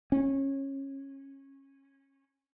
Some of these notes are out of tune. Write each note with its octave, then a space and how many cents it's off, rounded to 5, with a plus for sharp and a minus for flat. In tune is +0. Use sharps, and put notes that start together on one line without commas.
C#4 -20